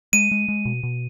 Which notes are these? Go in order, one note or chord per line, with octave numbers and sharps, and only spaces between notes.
G#3 D#7
G#3
G#3
B2
B2